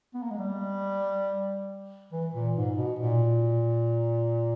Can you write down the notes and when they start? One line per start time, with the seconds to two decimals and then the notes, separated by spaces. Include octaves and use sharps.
0.14 B3
0.22 A#3
0.31 G#3
0.39 G3
2.12 E3
2.34 A#2
2.56 G#2
2.78 B2
2.99 A#2